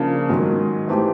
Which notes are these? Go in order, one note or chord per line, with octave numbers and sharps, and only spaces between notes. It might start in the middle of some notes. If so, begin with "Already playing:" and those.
Already playing: C#3 F3 A#3 D4
G#2 D#3 F#3
E3 A3 C4 D#4 G4